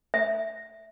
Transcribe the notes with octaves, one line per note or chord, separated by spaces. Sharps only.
E5